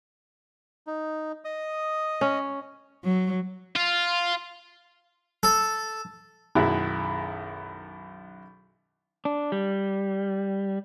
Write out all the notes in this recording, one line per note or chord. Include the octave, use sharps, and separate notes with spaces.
D#4
D#5 D#6
C#4
F#3
F4
A4
B1 F#2 D#3 E4 G#4 F#6
D4
G3